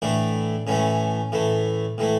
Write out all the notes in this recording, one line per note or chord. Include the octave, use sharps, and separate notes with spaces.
A2 E3 A3 D4
A2 E3 A3 C#4
A2 E3 A3
A2 E3 A3